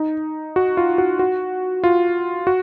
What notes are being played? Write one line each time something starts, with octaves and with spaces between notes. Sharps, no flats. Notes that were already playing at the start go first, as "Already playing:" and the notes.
Already playing: D#4
F#4
F4
F#4
F#4
F4
F#4